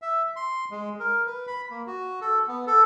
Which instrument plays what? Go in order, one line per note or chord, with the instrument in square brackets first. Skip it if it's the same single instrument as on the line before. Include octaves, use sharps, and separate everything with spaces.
[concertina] E5
C6
G#3
A#4
B4
B5
A#3
F#4
A4
B3
A4